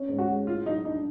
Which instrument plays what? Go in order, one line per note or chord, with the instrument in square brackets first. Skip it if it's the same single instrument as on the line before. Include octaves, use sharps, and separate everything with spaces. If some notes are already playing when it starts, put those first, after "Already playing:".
Already playing: [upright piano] C#4
G#2
[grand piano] F#4
[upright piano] G#3
[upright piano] A2 [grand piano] F4
[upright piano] F#3 [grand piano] D#4
[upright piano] D4 [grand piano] D#4